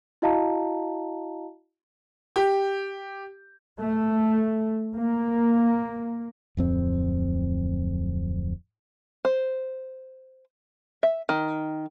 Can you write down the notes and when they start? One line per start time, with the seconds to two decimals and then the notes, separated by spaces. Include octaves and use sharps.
0.22 E4 F#4 D#5 F5 A5 A#5
2.36 G4
3.79 A3
4.95 A#3
6.57 D1 F2 C4
9.25 C5
11.03 E5
11.29 D#3